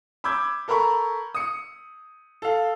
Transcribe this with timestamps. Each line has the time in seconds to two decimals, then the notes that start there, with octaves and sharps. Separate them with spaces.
0.24 B5 D6 E6 G6 G#6
0.68 A4 A#4 A#5 B5 C#6
1.35 D#6 C#7
2.42 A4 F5